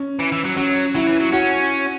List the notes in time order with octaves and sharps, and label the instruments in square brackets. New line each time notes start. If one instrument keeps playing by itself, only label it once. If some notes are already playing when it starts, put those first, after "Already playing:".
Already playing: [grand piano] C#4
[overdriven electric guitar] E3
E3
F#3
[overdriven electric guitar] F#3 [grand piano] C#4
[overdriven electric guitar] F#3 [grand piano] E4
[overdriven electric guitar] E3
F#3
[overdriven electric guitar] C#4 [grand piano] F#4